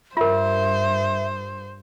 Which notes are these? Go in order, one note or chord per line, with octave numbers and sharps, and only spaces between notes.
G2 F4 A#4 C5 E5